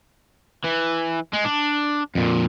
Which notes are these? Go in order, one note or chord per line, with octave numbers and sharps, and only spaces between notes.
E3
G#3
D4
F2 A#2